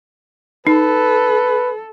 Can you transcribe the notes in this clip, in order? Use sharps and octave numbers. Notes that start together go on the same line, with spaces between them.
D#4 A4 B4